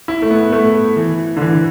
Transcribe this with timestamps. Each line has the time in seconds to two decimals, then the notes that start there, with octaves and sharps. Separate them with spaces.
0.08 E4
0.22 A3
0.30 B3
0.52 A3
0.96 E3
1.37 D3
1.42 E3